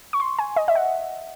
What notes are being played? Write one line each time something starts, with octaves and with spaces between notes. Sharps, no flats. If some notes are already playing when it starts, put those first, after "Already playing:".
C#6
C6
G#5
D#5
E5
F#5